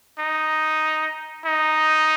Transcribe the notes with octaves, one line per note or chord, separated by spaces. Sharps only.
D#4
D#4